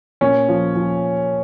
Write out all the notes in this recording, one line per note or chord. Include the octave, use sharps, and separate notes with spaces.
A#2 C#4
F3
F3